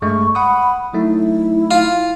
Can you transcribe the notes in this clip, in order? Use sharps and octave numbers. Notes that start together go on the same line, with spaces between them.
G2 G#3 A3 C#6
F#5 B5 D#6
F#3 A3 D#4 E4
F4